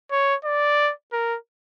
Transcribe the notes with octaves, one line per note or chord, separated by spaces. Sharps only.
C#5
D5
A#4